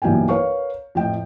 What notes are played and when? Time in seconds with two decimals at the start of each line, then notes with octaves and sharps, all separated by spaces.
0.02 B1 G2 E3 A#3 G5 G#5
0.29 A#4 B4 C#5 F5 C#6
0.95 F2 A2 G5